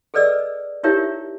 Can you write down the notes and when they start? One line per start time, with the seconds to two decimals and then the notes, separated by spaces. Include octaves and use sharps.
0.14 G#4 A4 B4 D5 D#5 E6
0.83 D#4 E4 G4 A#4 C#5 E5